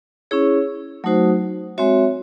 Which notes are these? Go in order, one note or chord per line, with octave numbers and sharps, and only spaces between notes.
C#4 E4 G#4 C#5
F#3 A3 D#4 F#4 C5
G#3 C4 F#4 C#5 E5